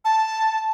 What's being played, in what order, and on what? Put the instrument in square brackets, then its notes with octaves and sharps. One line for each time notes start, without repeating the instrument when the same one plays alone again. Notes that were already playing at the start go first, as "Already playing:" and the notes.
[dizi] A5